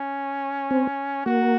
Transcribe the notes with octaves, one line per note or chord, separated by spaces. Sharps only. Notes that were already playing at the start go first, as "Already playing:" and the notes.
Already playing: C#4
C4
A#3 F#4